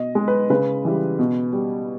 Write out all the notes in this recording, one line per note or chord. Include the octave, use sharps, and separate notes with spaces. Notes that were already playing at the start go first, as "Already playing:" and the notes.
Already playing: B2 D#5
G#3
B4
C#3 B4
E3 G3
B2
G3